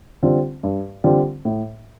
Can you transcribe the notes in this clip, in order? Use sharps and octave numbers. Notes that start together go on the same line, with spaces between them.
D3 G3 C4 F4
G2
D3 G3 C4 F4
A2